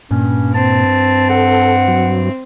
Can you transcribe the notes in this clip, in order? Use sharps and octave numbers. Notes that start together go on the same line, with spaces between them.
G2 A#2 C#4
C4 A5
A4 F#5
F#3